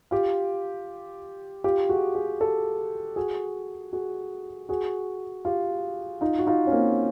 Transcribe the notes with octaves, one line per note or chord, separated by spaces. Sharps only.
F4 G4
F4 G4
F#4 G#4
F#4 G#4
G4 A4
F#4 G#4
F#4 G#4
F#4 G#4
F4 G4
D#4 F4
F#4
D#4 F4
C#4
A#3 C4